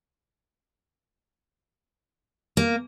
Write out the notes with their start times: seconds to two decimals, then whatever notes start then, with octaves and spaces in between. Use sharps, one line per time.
2.57 A#3